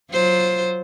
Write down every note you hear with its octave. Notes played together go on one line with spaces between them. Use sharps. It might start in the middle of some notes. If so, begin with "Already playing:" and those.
F#3 F4 C5